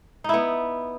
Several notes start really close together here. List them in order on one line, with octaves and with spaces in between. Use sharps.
D#4 E4 B3